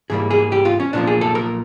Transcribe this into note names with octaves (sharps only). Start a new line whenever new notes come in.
G#2 E3 G3 A#3 G#4
G#4
G4
F4
C#4
B1 A#2 F3 A#3 D4
G#4
A4
A#4